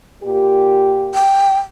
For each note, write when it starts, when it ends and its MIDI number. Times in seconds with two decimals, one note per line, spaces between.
0.23 1.21 46
0.23 1.21 67
1.14 1.58 79